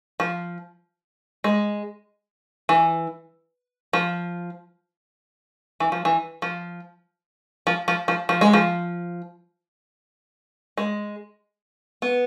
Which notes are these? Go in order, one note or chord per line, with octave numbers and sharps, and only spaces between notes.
F3
G#3
E3
F3
E3
F3
E3
F3
F3
F3
F3
F3
G#3
F3
G#3
B3